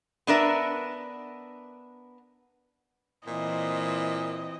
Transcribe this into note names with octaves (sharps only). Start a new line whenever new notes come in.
B3 D4 A#4 E5
A#2 E3 C4 E4 D#5